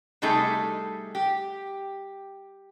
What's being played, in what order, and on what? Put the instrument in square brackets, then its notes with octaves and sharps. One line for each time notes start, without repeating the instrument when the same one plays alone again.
[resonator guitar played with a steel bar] C3 G3 A3 D#4 G#4 A4
G4